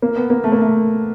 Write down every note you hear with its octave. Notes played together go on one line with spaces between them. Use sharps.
A#3
B3
A#3
A3
A#3
A3